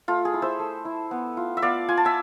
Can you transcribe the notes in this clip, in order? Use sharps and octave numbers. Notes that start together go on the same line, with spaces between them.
A3 F4
G#4
E4
C5 E5
A3
E4
B3
F4
E5
B3 D5 F5
F4 G#5
A5
E5 G#5